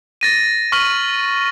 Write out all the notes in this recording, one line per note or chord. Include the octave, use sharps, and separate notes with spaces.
A6 A#6 D#7
C#6 F6 B6 D#7 F#7